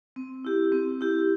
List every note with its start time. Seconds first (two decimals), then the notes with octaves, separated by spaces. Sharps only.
0.16 C4
0.45 E4 G4
0.72 C4
1.01 E4 G4